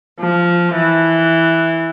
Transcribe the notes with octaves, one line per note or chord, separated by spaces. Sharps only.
F3
E3